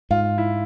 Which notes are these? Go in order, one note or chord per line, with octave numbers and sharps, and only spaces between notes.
G#2 F4
E4